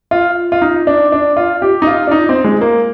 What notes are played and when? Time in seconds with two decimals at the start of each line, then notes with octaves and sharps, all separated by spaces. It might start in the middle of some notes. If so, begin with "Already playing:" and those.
0.11 F4
0.52 F4
0.62 D#4
0.87 D4
1.12 D4
1.37 F4
1.62 G4
1.82 D#4
1.87 F4
2.07 D4
2.11 D#4
2.29 C4
2.44 G#3
2.61 A#3